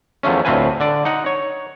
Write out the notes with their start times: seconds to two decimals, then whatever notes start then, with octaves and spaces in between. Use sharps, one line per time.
0.23 E2 F3 A3 C#4
0.45 D2 A2 C4 F4 B4 G#5
0.80 D3 D5
1.05 D#4 F#5
1.26 C#5